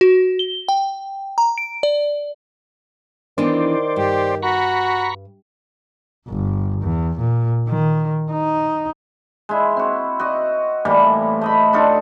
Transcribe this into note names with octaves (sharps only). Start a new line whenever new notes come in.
F#4
G7
G5
A#5
D7
D5
D#3 E3 B3 D4 C5 D5
G2 G4
F#4 A#5 B5 C#6
G1
E2
A#2
D#3
D#4
G#3 E4
C4 F#4
F#4 D#5
A2 E3 G3 A#3
A3 D#5 B5
D4 D#4 F4 A4